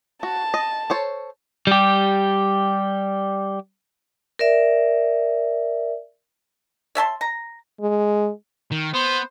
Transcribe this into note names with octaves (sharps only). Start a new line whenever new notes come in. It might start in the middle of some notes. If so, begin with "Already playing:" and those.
F#4 A5
D#5
A4 C5 C#5
G3 G4
A#4 D5 E5
C#5 E5 A5 C6
A#5
G#3
D#3
B3 C5